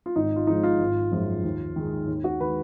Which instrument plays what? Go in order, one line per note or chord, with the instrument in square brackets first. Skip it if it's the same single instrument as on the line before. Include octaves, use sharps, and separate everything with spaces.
[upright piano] F4
G#1 D#4
F4
G#2 F3 G#3 D#4
F4
G#1
F#2 F3 G#3
D#2
D#3 G#3
D#2
F#4
D#3 G#3 B4